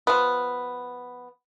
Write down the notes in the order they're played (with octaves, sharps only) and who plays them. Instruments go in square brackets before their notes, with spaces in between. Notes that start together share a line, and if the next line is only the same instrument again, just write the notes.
[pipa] F3 B3